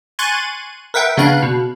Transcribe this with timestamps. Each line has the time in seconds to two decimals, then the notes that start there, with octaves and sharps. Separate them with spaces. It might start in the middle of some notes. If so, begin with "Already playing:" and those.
0.19 G#5 C6 C#6 F#6 A6 D#7
0.94 A#4 B4 E5 F#5 G5
1.17 C#3 B3 D4 F5 F#6
1.42 B2